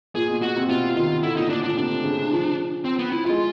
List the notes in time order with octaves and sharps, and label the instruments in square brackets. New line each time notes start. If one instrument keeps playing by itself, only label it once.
[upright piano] A#2 [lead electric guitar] G#4
[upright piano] B2
[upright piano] B2 [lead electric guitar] F#4
[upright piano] C3
[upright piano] B2 [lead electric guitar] F4
[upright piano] D#3 [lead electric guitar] F4
[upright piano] D3 [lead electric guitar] E4
[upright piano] A#2 [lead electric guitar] D#4
[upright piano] A2 [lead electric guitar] D4
[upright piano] A#2 [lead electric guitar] D4
[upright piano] C3 [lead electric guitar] D4
[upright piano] C#3
F3
[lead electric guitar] C4
B3
E4
[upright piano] G#3 [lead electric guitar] F4